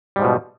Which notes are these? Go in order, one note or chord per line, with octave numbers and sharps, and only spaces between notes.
G#2 B2 F3 G3